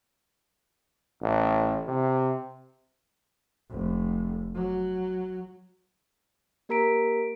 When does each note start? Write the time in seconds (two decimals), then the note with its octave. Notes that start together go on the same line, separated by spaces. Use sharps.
1.22 A1
1.88 C3
3.71 F1
4.55 F#3
6.69 A#3 G4 A#4 A#5 B6 D7